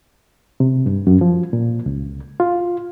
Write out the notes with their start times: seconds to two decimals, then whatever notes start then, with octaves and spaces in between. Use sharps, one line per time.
0.60 C3
0.86 G2
1.07 F#2
1.21 F3
1.53 A#2
1.86 C#2
2.40 F4